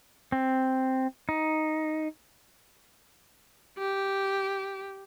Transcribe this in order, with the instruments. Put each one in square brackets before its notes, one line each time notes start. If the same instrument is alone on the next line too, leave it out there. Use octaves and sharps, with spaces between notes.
[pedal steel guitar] C4
D#4
[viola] G4